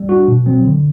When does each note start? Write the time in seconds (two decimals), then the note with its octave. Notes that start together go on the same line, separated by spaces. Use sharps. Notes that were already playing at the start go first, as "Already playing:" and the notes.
Already playing: G3
0.09 D4 F#4
0.28 B2
0.46 F#3 C4
0.64 D3